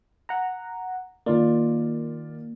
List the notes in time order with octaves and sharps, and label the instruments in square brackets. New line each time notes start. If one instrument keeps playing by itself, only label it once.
[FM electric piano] F#5 A#5
[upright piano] D#3 F4 D5 [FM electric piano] A#3